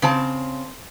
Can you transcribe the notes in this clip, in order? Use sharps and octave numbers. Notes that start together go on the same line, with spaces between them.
C#3 C4 A5